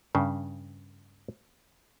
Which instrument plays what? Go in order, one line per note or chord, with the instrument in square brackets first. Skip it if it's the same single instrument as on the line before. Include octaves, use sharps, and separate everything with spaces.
[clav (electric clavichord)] G2 C#3